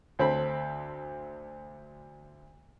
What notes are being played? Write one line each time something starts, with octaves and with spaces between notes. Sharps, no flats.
D2 C4 A4 B5